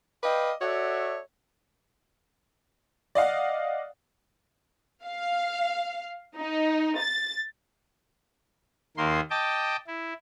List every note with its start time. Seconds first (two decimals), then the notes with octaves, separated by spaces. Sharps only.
0.23 B4 D5 D#5 F5 G5
0.61 F#4 A4 C#5 D5 E5 F#5
3.15 D5 D#5 F5 F#5
5.07 F5
6.36 D#4
6.98 A6
8.97 D#2 D#3 A#3 C6
9.30 D#5 G5 A5 D6
9.87 E4